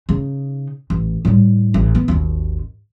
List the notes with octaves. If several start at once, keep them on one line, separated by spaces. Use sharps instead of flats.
C#3 D#4
A1
A2 G3
A1
B3
G#1 D#2